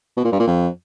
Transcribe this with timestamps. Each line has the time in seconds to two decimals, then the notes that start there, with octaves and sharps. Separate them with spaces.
0.17 B2
0.25 A#2
0.32 G2
0.40 A#2
0.47 F2